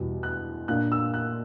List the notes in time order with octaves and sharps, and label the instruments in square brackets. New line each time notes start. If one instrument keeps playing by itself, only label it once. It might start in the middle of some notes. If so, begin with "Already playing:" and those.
Already playing: [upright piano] E2 B2 G3
F#6
A#2 A#3 D4 F#6
E6
F#6